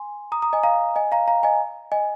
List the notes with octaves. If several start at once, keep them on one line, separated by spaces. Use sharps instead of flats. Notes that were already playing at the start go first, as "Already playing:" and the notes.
Already playing: G#5 C6
A#5 D#6
A#5 D#6
D#5 G#5
F5 A#5
D#5 G#5
F5 A#5
F5 A#5
D#5 G#5
D#5 G#5